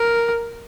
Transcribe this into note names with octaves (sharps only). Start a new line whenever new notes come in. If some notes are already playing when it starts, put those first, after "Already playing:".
Already playing: A#4